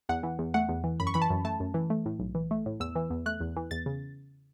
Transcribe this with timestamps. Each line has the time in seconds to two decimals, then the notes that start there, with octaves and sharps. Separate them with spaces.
0.09 E2 F#5
0.23 E3
0.39 E2
0.54 A3 F#5
0.69 E2
0.84 E3
1.00 F#2 B5
1.07 C#6
1.14 E3 B5
1.22 A5
1.30 F#2
1.45 A3 A5
1.60 F#2
1.74 E3
1.90 A3
2.06 A2
2.20 B1
2.35 E3
2.51 A3
2.66 A2
2.80 E2 E6
2.95 E3
3.10 E2
3.26 A3 F#6
3.40 E2
3.57 E3
3.71 E2 A6
3.86 C#3